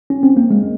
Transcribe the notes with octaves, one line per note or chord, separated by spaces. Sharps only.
C#4
C4
A#3
G#3